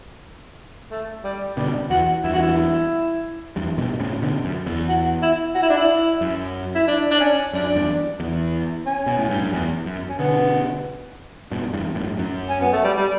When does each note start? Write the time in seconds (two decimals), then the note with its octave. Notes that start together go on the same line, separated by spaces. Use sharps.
0.91 A3
1.24 G3
1.57 B2 D3 G3
1.90 E2 F#4
2.24 E2 G2 E4
2.33 F#4
2.42 E4
3.56 E2 G2
3.78 G2 B2
4.00 A2 C#3
4.22 B2 D3
4.44 F#2
4.66 E2
4.89 F#4
5.22 E4
5.55 F#4
5.62 E4
5.70 D4
5.77 E4
6.21 F#2
6.76 E4
6.87 D4
7.11 D4
7.20 C#4
7.53 F#2 D4
7.75 E2 G2
8.20 E2
8.86 C#4
9.06 B2
9.18 A2
9.30 G2
9.40 F#2
9.53 E2
9.85 F#2
10.09 C#4
10.19 B2 D3 B3
11.51 G2 B2
11.73 E2 G2
11.95 F#2 A2
12.18 F#2
12.49 C#4
12.61 B3
12.73 A3
12.84 G3
12.97 G3